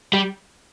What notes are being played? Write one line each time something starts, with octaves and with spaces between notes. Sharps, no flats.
G3